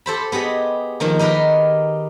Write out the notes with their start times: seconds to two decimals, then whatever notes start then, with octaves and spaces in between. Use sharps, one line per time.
0.06 G4 A4 C5 B5
0.32 B3 G4 G#4 D#5
1.00 D#3 F3 A#3
1.19 D#4 G4 A#4 B4